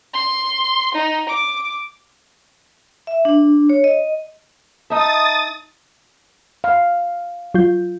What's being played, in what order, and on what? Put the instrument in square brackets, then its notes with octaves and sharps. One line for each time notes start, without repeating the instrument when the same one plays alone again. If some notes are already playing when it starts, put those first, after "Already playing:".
[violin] C6
D#4
D6
[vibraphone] E5
D4
C#5
D#5
[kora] D#4 E5 [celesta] A5 A#5 [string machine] D#6 A6
[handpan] F5
[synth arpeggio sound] F#3 F4 G6